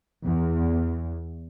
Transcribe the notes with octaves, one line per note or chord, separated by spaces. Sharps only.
E2